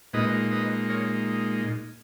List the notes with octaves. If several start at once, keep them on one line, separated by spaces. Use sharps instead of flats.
A#2 G#3 D#4 B4 D#5
B4 D#5
A#4 C#5